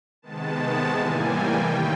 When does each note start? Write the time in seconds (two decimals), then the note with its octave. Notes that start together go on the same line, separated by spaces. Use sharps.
0.22 C3 D#3 G#3 B3 A5
0.86 A2 E3 G3 A#3 G#5
1.20 G5
1.51 C3 D#3 G3 G5